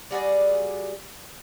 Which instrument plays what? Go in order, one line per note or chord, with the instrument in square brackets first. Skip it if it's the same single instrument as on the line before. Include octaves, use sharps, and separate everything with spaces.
[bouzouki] G3 F#4 G#4 D5